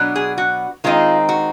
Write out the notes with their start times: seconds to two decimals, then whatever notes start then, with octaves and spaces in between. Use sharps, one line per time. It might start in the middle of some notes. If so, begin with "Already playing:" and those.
Already playing: B2 F#3 B3 D4
0.16 G#4
0.38 F#4
0.84 D#3 G#3 C4 D#4 F4
1.29 F#4